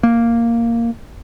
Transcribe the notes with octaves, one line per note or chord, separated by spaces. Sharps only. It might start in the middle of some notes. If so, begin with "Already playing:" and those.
A#3